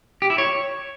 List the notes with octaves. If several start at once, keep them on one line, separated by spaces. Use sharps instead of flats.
G4
E4
C#5